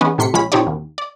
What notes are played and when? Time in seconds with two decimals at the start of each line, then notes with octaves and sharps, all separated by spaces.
0.01 E2 G#3 B3 C#4
0.18 A2 C3 C6 B6 C#7
0.33 A#1 G#3 C#4 B5
0.52 A#1 C4 D#4 G4 C#5 D5
0.67 D#2
0.98 D5